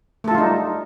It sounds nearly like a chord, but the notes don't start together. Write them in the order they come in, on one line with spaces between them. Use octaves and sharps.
A3 A4 F4 G3 D#4